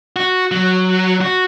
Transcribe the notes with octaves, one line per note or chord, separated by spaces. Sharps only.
F#4
F#3
F#4